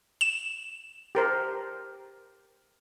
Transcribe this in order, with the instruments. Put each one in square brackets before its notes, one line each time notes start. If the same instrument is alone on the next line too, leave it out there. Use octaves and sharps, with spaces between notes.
[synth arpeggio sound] E7
[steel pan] G4 A#4 C5